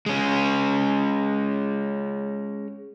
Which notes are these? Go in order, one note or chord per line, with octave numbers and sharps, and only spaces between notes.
G#3 C#4